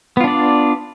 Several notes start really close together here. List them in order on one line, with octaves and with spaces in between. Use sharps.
B3 F4 D4 D5